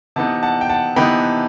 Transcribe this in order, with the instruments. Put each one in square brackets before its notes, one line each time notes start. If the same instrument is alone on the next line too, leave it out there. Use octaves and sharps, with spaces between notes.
[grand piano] C3 E3 B3 D#4 F#5 A5
F#5 A5
G5
F#5 A5
C3 E3 B3 D#4 G5 B5